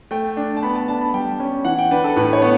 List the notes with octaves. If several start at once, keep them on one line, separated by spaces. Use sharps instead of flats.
A3 G5
D4
A5
B3 B5
A5
D4 A5
B5
G3 G5
C#4
E3 F#5
G5
D4 B4
A4
A2 B4
C#5
B3